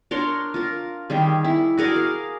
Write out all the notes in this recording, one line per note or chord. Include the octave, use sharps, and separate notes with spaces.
D4 A#4 C#5 C6
F4 A#4
D#3 G3 G#4
E4
F#4 G#4 A#4 D5
F5